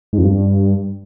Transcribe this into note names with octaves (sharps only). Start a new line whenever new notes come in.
G#2
F2
G2